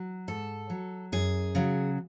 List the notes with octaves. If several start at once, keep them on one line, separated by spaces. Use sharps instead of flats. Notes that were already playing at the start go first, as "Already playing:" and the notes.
Already playing: F#3
G#2 A4
F#3
F#2 G#4
C#3 F#3